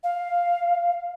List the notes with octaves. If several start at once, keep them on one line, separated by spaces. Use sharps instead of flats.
F5